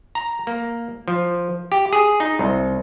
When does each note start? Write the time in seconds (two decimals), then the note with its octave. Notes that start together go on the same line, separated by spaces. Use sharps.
0.15 A#5
0.47 A#3
1.08 F3
1.72 G4
1.93 G#4
2.20 D#4
2.39 C2